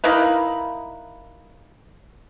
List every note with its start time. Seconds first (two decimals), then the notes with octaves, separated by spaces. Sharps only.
0.04 A#3 D#4 E4 B4